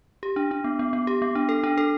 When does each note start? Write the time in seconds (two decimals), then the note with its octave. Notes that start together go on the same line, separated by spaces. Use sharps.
0.23 G4
0.36 D4
0.51 D4
0.64 B3
0.79 B3
0.93 B3
1.07 G4
1.22 B3
1.35 D4
1.49 A4
1.64 D4
1.78 A4